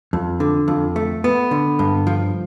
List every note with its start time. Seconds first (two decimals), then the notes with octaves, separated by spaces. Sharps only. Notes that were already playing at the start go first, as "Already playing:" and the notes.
0.13 F2
0.40 D3
0.68 F2
0.96 A3
1.24 B3
1.51 D3
1.79 G2
2.07 F3